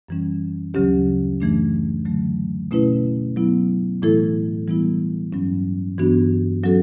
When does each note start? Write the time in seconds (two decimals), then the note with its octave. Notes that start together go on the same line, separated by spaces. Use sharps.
0.09 F#2 E3 G3 C#4
0.74 D2 C#3 F#3 C#4 G4
1.40 F#2 E3 A3 D4
2.05 D3 F#3 A3
2.71 B2 A3 C#4 E4 B4
3.36 F#3 B3 E4
4.02 A2 E3 A3 E4 A4
4.68 E3 G3 B3 E4
5.33 G2 F#3 C#4
5.98 G2 E3 B3 D4 F#4
6.64 F#3 C#4 F#4 A4